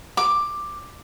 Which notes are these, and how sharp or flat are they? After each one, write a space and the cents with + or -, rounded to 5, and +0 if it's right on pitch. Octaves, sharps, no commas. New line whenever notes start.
D6 +10